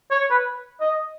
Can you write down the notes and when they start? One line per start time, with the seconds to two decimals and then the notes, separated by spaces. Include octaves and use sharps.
0.11 C#5
0.30 B4
0.81 D#5